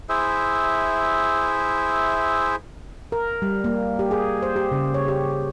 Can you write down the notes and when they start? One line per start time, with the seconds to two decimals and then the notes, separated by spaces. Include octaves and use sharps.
0.09 E4 G#4 C5 E5
3.12 A#4
3.42 G3
3.64 A#3
3.99 G4
4.11 G#4
4.43 C5
4.56 G4
4.72 C#3
4.94 C#5
5.08 G4